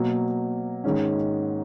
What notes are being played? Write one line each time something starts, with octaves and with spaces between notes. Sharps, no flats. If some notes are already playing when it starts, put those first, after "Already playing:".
Already playing: B2 F#3 A#3
G#2 D#3 G#3 C#4